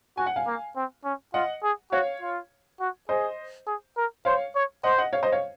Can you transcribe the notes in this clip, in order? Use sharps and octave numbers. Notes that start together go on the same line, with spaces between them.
F#4 G#5
F#5
F5 G#5
A#3
C4
C#4
F4 D#5 F#5
G#4
F#4 C#5 F5
F4
F#4
G#4 C5 D#5
G#4
A#4
C5 C#5 F5
C#5
C5 D#5 F#5
D#5 F#5
C#5 F5
C5 D#5
C#5 F5